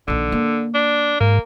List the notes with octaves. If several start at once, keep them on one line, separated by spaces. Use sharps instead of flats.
A#1 D3 D#3
A#3
D4
G#2 A#3